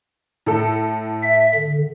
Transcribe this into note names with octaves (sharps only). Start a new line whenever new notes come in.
A2 A4
E5
D3